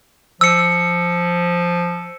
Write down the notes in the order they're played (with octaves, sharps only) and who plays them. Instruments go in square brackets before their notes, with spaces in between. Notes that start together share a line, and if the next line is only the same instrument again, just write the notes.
[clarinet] F3 [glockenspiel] E6 C#7